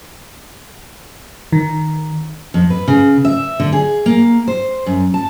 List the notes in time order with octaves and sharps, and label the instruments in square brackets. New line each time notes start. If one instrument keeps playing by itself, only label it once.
[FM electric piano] D#3
[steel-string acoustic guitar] F2
B4
C#3
E5
D3
G#4
A#3
C5
F#2
A5